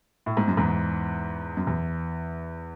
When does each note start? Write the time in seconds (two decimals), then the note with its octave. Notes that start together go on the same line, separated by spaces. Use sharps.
0.26 A2
0.37 G#2
0.48 F#2
0.57 E2 G#2
1.57 F#2
1.67 E2